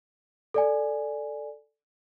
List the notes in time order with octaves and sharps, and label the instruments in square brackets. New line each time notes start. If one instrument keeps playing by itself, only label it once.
[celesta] A4 D5 G#5